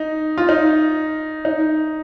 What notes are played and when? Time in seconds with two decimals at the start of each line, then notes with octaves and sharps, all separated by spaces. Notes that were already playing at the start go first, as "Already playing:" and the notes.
Already playing: D#4
0.38 F4
0.49 D#4
1.45 D#4